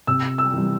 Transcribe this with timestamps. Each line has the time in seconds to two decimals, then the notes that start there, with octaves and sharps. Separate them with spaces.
0.07 C3 E6
0.38 E6
0.53 E3 G3